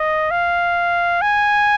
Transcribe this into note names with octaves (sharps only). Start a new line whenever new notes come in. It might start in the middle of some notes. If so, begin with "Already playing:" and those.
Already playing: D#5
F5
G#5